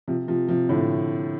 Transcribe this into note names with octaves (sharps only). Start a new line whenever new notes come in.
C3 F3
C3 F3
C3 F3
A2 D3